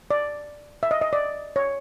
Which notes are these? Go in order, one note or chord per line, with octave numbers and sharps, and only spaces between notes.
D5
E5
D#5
D#5
D5
C#5